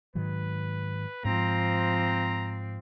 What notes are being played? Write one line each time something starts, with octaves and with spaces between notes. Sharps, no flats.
G#2 D#3 F#3 B4
G#2 F3 C4 A#5